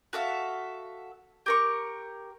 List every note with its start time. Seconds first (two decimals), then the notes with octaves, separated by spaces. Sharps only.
0.13 F#4 A4 E5 F5
1.46 G4 A#4 C#6